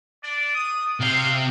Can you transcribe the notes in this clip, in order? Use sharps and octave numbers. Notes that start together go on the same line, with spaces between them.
D4 D5
D#6
C3 F5 G5